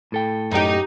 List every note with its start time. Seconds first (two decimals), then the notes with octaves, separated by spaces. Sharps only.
0.12 A2 A4 G5
0.51 F#2 D#4 G4